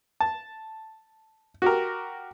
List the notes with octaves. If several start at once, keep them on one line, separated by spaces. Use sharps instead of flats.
A5
F#4 G4 A#4